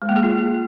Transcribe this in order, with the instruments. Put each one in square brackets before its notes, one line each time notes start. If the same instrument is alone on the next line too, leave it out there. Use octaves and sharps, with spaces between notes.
[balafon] G#3
A#3
G#4
F4